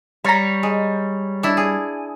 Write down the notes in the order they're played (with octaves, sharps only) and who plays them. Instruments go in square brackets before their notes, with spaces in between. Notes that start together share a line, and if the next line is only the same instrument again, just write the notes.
[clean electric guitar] G3 [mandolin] C#5 A#5
[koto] G#3
D4 E4
G#4